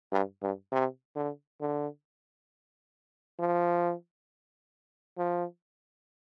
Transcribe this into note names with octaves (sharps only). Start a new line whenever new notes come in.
G2
G2
C3
D3
D3
F3
F3